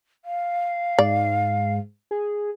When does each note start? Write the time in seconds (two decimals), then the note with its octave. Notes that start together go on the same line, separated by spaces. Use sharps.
0.25 F5
0.99 G#2 D5
2.11 G#4